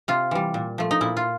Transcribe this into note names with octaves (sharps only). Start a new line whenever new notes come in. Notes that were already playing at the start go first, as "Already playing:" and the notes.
C3 F4
E3 G3
A#2
F3 A3
D#4
A#2 E4
F4